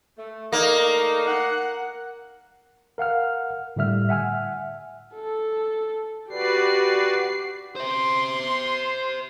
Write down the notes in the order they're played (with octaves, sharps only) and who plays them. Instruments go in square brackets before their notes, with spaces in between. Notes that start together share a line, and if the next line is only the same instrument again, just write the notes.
[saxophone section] A3
[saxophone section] A3 D4 D#4 [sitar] A#3
[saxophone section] F#5
[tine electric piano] A#4 F5 F#5 F6
A2 D3 G3 E5 F6
E5 F#5 G#5 F6
[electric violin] A4
[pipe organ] F#4 B4 D5 [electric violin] G4 C7
[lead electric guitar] C5 E5 [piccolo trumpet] C6